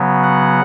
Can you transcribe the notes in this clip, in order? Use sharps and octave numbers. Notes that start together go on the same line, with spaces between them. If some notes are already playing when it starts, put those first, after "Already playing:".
Already playing: C#3 F#3 B3
F#5